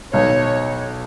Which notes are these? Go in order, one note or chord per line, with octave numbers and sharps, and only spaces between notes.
B1 C#5